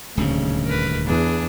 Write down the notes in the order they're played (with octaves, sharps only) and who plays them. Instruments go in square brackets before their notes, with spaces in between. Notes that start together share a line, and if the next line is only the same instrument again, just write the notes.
[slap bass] D#1 D2 G#2 [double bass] C#3
[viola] A#4 B4
[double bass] E2 [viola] D4 G#4